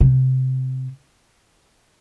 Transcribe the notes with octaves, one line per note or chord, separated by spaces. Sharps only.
C3